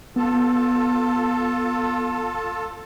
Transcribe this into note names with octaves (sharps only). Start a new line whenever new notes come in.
B3 F4 A4 A5